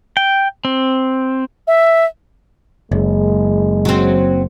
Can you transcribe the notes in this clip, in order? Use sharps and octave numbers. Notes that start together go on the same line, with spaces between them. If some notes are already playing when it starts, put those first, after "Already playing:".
G5
C4
E5
F#1 G#3
F#3 C4